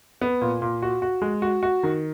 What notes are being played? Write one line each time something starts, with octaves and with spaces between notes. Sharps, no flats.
B3
A#2
A#2
F#4
F#4
G#3
F#4
F#4
D#3